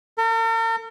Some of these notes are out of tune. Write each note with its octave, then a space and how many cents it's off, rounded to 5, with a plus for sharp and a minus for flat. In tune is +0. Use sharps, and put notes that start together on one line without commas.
A#4 -45